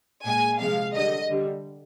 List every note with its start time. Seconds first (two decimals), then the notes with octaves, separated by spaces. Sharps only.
0.25 A#2 G#3 G#5
0.59 C3 F3 G#3 F5
0.94 D3 G3 D#5
1.30 D3 G3